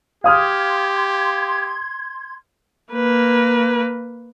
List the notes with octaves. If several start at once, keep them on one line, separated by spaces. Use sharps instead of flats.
G4 F5 C6 D#6 F6 G#6
A#3 B4